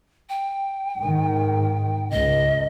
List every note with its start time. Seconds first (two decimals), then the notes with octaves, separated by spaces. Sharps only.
0.29 G5
0.98 G#2 D#3
2.11 C#2 D#5